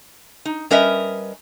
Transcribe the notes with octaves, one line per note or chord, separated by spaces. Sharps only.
D#4
G3 C#4 A#4 B4 D#5 E5